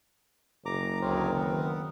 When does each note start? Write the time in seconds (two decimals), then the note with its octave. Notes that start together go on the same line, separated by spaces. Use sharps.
0.66 F#1 A#5 D6
1.02 D2 F#3 C4 A#4 C5
1.35 D#3 B3